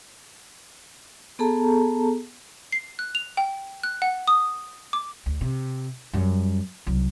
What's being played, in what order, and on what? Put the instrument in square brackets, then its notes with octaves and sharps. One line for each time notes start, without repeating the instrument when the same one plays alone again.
[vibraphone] B3 G#4 A4 A5 A#5
[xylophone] C7
F#6
F7
G5
F#6
F#5
D#6
D6
[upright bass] D2
C3
F#2 G3
C2 F#3